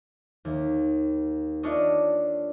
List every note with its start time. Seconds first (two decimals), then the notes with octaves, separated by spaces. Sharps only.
0.45 D#2
1.63 D4 F4 A4 C#5 D#5